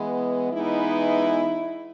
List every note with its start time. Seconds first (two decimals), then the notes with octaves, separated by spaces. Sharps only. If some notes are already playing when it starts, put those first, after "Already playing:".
Already playing: E3 G#3 B3
0.52 E3 G#3 B3 D#4 E4